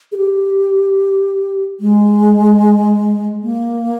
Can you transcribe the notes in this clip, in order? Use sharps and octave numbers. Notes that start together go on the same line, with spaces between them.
G#4
G4
G#3
A#3